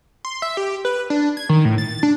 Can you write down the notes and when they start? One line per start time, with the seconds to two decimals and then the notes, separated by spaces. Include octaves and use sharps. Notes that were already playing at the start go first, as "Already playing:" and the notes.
0.25 C6
0.42 E5
0.57 G4
0.85 B4
1.10 D4
1.37 G#6
1.49 D#3
1.65 A2
1.78 A6
2.03 D4